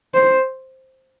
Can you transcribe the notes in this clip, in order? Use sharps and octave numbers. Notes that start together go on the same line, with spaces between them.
C5